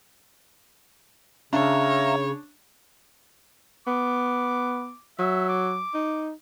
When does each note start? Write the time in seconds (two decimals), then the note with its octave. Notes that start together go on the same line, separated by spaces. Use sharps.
1.53 C#3 D4 C#5 E5 F5 A#5
3.87 B3 D6
5.19 F#3 E5
5.49 D6
5.94 D#4